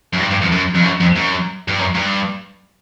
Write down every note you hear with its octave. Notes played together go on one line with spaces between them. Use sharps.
F#2
G2
G2
F2
F#2
F2
F#2
F2
F#2
G2
F#2
G2